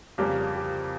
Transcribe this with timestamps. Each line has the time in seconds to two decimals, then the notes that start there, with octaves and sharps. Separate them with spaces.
0.18 F2 C#3 G3 A#3 G4
0.55 G4